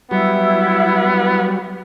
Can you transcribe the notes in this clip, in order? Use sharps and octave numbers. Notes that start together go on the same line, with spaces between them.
F#3 G3 B3 E4